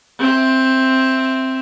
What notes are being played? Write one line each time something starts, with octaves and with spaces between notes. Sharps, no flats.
C4 E5